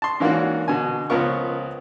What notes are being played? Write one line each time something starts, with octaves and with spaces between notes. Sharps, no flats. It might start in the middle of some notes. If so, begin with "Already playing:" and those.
A5 C6
G#2 E3 A#3 C#4 D4 F#4
B2 D3 G#5
C#2 F3 B3 F4 A#4 C#6